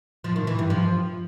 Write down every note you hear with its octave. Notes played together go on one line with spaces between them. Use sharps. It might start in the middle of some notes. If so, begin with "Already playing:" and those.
F3
D#3
E3
G2
F3